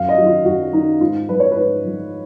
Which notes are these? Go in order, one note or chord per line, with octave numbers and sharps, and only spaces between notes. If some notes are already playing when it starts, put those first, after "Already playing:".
Already playing: F#2 F5
D#5
D#3 F#3
F4
F#2 F#4
D#3 F#3 D#4
G#2 F4
F3 B4
C#5
G#2 B4
F3